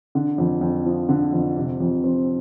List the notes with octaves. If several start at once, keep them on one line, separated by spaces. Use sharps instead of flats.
D3
F2
F2
F3
D3
F2
C3
F2
C4